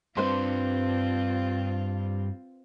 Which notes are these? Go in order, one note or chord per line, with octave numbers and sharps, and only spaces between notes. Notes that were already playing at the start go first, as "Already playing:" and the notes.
G2 C4 F4 B4 C5 C6